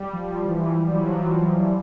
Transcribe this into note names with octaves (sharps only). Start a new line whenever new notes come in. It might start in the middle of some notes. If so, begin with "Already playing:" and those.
Already playing: G3
F3
E3
G3
F#3
F3
F#3
F3
G3